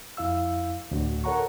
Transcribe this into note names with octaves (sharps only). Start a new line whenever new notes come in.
F2 E4 F5 E6
D2 A2 F#4
A4 A#4 C#5 F#5 A#5 C#6